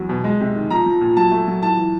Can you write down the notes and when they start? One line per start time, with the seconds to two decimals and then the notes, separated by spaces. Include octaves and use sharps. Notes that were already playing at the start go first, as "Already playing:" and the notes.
Already playing: E2 F#3
0.09 B2
0.24 G#3
0.40 C3
0.55 D#3
0.71 F3 A#5
0.86 F3
1.01 A#2
1.17 F#3 A5
1.31 A3
1.47 F#3
1.62 A2 A5
1.77 E3